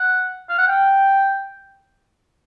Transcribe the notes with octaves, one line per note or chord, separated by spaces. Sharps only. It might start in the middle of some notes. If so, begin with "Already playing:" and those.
Already playing: F#5
F5
F#5
G5